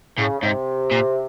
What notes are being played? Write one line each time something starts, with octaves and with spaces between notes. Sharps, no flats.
A2 C#3
C#3
G#2 C3
A#2